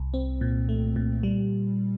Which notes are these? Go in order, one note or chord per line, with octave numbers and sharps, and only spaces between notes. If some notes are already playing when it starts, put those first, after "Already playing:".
Already playing: C2
C4
A#2
A3
A#2
G3